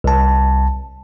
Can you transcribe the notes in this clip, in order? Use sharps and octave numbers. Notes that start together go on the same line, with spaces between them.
C2 A5